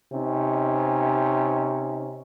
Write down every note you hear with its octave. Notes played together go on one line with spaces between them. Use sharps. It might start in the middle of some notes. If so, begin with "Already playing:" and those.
C3 C#4 D#4